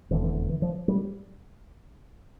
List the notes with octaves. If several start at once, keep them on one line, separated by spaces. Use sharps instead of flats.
F1 E2 D3 E3
E3
E3
F3
G3